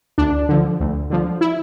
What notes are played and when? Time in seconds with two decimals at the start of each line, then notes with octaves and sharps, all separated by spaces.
0.18 D2 D4
0.49 D3 F3
0.80 D2
1.10 D3 F3
1.41 E4